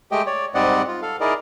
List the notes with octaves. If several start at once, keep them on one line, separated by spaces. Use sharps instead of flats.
G#3 A3 G4 D#5 G5
C#5 D5
G#2 G3 C4 D5 D#5 F#5
F4
A4 F5
D#4 E4 G#4 A#4 D5 D#5